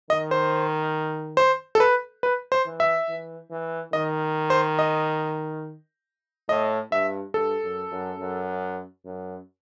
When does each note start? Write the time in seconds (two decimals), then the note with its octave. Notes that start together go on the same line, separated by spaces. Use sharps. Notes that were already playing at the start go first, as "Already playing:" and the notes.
0.10 D#3 D#5
0.31 C5
1.37 C5
1.75 A4
1.80 B4
2.23 B4
2.52 C5
2.65 E3
2.80 E5
3.09 E3
3.51 E3
3.93 D#3 D#5
4.50 C5
4.79 D#5
6.49 A2 D#5
6.92 G2 E5
7.34 G2 A4
7.63 F#2
7.91 F#2
8.19 F#2
9.05 F#2